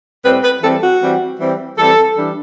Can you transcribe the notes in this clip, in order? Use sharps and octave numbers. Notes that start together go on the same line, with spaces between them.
A2 G3 C4 B4
B4
E3 G3 C4 A4
F#4
E3 G3 C4
E3 G3 C4
E3 G3 C4 A4
E3 G3 D4